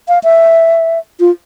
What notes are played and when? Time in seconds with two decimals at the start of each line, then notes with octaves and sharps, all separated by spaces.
0.08 F5
0.24 E5
1.20 F4